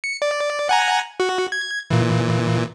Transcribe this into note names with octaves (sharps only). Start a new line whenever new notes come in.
C#7
D5
F#5 G#5 A#5
F#4
G#6
A#2 E3